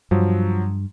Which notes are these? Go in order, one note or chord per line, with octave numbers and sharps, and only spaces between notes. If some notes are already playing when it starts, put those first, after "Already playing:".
G2 F3 F#3